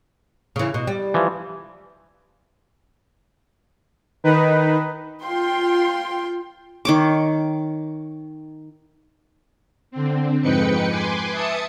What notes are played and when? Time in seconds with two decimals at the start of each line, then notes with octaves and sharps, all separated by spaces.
0.56 C#3 E3
0.74 B2
0.87 G3
1.14 E3 F3
4.24 D#3 D#4 B4
5.25 F4 G5 C6
6.85 D#3 C#5 D6
9.91 D3 C4
10.42 F2 G#2 D#4 B4 G5 C#7
10.89 B4 G#5 C6 D6
11.31 E5 A5 D#6 C#7